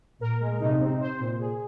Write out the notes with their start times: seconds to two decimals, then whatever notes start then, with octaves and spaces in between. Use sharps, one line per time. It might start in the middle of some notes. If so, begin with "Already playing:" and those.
0.21 A#2 A#4
0.41 G#3
0.60 C3 D#4
0.80 C4
1.00 C5
1.20 A#2
1.39 G#4